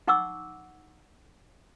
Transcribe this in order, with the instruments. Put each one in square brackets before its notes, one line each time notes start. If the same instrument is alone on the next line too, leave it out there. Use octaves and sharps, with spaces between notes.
[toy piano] D#4 F#5 C#6 D6 E6